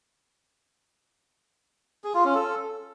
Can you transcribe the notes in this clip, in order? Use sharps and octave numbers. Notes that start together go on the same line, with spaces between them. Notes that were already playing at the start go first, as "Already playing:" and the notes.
G#4
F4
C#4
A4